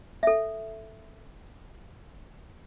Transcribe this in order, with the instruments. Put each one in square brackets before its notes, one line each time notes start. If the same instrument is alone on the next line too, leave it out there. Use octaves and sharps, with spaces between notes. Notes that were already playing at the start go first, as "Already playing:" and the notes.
[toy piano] A4 E5